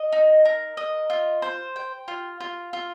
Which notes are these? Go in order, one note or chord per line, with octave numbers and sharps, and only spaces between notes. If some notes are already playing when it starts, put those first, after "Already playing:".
Already playing: D#5
D#4
A#4
D#5
F4
C5
G5
F4
F4
F4